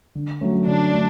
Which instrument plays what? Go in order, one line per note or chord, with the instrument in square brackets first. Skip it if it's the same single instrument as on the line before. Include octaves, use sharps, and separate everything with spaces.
[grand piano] D3
F#3 A3 C#4
[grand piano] D3 [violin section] D4
[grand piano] F#3 A3